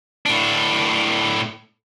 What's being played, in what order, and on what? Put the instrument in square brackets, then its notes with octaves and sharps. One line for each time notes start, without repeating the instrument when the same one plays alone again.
[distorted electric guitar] A2 D4